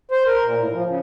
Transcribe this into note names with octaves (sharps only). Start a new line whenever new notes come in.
C5
A#4
A#2
A2
F3
C#3